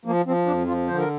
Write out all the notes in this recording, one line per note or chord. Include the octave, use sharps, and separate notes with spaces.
F3 A#3
F3 C4
F2 D4
F3 F4
D3 C5
A#4